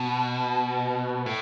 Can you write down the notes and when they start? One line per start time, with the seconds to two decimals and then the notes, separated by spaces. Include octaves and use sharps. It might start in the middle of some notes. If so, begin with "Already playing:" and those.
Already playing: B2
1.26 A2